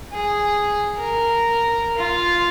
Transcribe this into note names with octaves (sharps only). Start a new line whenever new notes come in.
G#4
A#4
F4